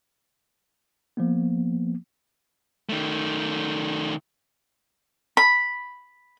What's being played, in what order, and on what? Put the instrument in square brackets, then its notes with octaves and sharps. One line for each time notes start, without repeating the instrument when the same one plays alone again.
[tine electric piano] F3 A#3 B3
[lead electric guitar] D#3 A3
[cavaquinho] B5